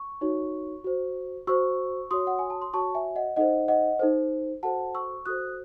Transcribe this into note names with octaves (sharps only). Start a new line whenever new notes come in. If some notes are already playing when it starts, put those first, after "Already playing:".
Already playing: C#6
D#4 F#4 C#5
F#4 C5
F#4 C5 C#6 E6
F#4 C#5 C6 D#6
F#5
G#5
A5
C6
F#4 C#5 A5 C#6
E5 G#5
D#5 F#5
D#4 A4 C5 D#5 F#5
D#5 F#5
D#4 A4 C5
F#4 A4 C5 F#5 A5
C#6 E6
F#4 A4 C5 D#6 F#6